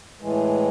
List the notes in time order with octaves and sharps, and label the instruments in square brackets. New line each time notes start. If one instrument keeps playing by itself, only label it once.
[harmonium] A2 E3 G#3